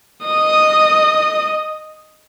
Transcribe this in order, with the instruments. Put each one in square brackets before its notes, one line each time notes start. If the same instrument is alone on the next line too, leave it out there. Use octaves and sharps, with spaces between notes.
[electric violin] D#5 D#6